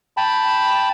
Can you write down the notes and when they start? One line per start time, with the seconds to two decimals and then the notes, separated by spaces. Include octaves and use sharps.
0.17 G5 A5 B5